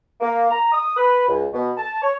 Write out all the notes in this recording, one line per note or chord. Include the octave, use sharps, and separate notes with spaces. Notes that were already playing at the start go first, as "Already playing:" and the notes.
A#3
A#5
D#6
B4
C#2
B2
A5
C#5